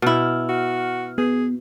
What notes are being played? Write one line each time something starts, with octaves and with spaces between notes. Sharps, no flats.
B2 E4 F6
F#4
B3 G#4